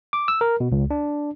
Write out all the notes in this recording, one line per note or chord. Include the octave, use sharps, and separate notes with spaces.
D6
E6
A#4
B2
C#2
D4